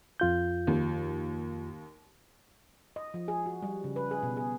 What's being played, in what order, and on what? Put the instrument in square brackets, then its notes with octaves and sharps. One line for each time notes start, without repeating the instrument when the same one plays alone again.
[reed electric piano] F2 F4 G6
[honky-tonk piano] D#2
[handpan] D#5
F3
G#4
F#4
G3
C#3
B4
G#4
B2
G#4